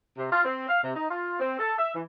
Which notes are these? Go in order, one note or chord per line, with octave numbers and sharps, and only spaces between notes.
C3
F4
C4
F5
C3
D#4
F4
C4
A4
E5
E3